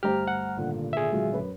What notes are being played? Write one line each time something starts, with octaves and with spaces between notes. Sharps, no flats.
D2 G2 G4 C5 A#5 F6
F#5
G#1 A#2 D3
G#4 E5
F#3 G#3 F4
F#2 B4